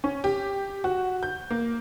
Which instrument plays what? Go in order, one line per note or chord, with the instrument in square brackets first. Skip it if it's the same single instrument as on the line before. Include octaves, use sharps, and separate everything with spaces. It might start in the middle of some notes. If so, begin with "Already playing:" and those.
[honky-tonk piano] C#4
G4
F#4
G6
A#3